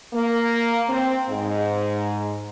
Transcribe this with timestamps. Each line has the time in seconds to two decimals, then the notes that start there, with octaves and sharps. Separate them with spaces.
0.13 A#3
0.90 C4
1.29 G#2